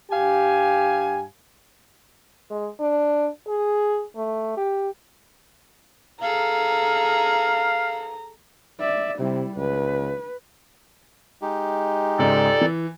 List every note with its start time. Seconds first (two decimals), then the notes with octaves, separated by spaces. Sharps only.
0.11 G2 G4 F5 G#5
2.50 G#3
2.80 D4
3.47 G#4
4.16 A3
4.57 G4
6.23 G#4 A4 F5 A#5
8.80 D5 E5
9.18 C3 G3 E4
9.57 C#2 B4
11.42 G#3 D#4 G4
12.19 C#2 G#2 C#3 A4 D5
12.61 E3